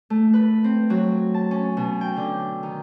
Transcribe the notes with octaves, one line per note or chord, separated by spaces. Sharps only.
A3
B4
C4
F#3
A5
C#4
B2
G5
D3
D#3